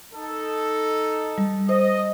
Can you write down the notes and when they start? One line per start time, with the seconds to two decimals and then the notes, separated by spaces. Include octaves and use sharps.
0.14 D#4 A4
1.38 G3
1.69 C5 D#5